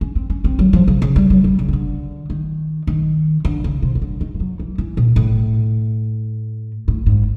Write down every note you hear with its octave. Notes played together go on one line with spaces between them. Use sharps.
C#4
C4
C#4
C4
F#3
F3
C#3
C#3
G3
F#3
G3
C#3
D#3
D3
D#3
D#3
D3
C#3
C3
C#3
D3
D#3
F3
F#3
E3
E3
A#2
A2
A2
G#2